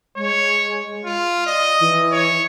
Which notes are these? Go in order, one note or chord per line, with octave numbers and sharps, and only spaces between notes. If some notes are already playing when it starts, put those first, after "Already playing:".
G#3 C#5
F4
D5 D#5
E3
C#5